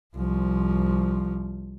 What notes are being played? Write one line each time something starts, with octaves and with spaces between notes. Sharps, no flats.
C2 F3